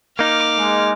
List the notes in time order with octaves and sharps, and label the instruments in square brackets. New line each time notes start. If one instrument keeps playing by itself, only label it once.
[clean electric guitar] A#3 D#4 [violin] D6 F6
[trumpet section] G#3